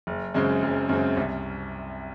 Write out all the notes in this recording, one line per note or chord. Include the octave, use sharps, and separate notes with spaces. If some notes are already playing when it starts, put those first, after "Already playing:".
F#1
F#2 C#3 G#3 C4
F#1
F#2 C#3 G#3 C4
C2